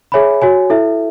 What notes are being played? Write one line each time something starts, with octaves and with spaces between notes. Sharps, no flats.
G#4 C#5 E5 G#5 B5
F#4 C#5 G#5
E4 A4 E5